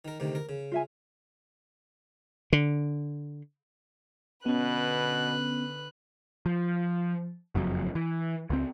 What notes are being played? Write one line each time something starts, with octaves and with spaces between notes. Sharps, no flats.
D#3 A#4
D2 C3 D#3
A#4
C#3
F4 E5 G#5
D3
B2 D3 B3 C#4 B4 F#6
F3
F#1 F2 C#3 F#3
E3
C#2 C4